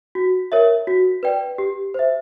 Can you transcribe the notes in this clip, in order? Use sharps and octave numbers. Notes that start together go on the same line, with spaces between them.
F#4
A#4 C#5 E5
F#4
B4 D5 G5
G4
C5 E5